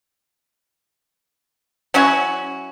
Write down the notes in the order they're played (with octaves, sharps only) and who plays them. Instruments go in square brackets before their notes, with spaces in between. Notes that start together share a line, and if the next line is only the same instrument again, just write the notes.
[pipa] F#3 C#4 E4 F#4